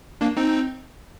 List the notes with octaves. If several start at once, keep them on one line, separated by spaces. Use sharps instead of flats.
A#3 D4
C4 D#4